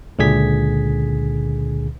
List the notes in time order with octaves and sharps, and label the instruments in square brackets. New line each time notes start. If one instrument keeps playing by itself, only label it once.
[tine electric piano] C#2 A#2 D3 G#4 G#6 B6